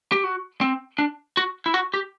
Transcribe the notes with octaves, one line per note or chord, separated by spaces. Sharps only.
G4
F#4
C4
D4
F#4
E4
F#4
G4